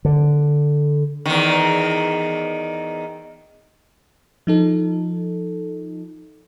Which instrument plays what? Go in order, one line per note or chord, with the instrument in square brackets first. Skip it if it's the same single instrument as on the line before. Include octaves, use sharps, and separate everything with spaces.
[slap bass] D3
[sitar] E2 D#3
[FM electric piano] F3 D#4 A4